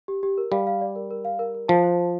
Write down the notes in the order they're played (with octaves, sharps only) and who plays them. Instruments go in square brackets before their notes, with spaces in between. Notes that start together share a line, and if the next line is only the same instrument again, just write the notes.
[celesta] G4
G4
A#4
[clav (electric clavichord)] G3 [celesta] F5
[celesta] F5
D5
A#4
A#4
F5
A#4
A#4
[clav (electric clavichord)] F3 [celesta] A5
[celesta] C5
A5